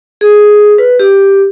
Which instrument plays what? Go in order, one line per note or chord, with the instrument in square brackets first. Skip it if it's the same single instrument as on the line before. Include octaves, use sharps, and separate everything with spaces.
[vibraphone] G#4
B4
G4